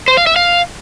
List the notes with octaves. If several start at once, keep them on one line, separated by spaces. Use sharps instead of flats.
C5
F5
E5
F5